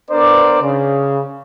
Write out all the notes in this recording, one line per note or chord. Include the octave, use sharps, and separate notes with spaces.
B3 D4 A#4 C5 D5
C#3